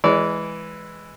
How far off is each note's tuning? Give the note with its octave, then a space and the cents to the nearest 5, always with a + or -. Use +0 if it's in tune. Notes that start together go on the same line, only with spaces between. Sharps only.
E3 +0 G#3 +0 D5 -30